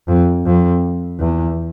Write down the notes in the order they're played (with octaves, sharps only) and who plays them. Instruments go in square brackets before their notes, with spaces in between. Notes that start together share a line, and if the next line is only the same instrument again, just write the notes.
[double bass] F2
F2
E2